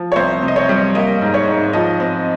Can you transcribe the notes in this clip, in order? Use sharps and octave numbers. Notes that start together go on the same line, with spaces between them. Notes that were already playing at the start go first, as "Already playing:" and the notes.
Already playing: F3
C#5
C2 C5
C3 D#5
C#5
G3
A#3 D#5
G#2
C#5
G#2
F3 D#5
C4